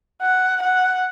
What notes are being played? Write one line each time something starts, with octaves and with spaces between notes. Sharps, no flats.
F#5
F#5